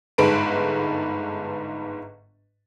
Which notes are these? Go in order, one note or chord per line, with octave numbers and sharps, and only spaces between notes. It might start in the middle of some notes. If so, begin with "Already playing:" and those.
G1 G#2 A4 B4 D7